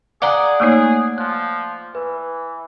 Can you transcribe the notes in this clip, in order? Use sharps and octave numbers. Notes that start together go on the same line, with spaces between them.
G#4 D5 F5 F#5 A#5
A3 A#3 D#4 G#4 C#5 C#6 F#6
F3 F#6
E3 B4